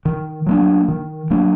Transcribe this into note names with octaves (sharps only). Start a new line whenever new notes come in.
D#3
F#3 A#3 D4
D#3
F#3 A#3 D4